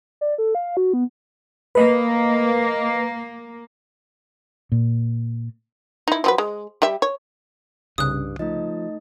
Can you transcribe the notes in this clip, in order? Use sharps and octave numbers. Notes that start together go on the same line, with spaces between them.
D5
A4
F5
F#4
B3
A#3 B4 D#5
A#2
D#4 E4
F3 F#3 B4
G#3
G3 G4 E5
C#5
C2 G2 C#3 D#6 F#6
F3 A3 D#4 D#5